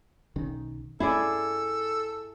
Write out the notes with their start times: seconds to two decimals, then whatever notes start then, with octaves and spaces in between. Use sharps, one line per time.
0.36 B1 D#3 C#4
1.00 G2 A3 C#4 E4 G#4 A4 D5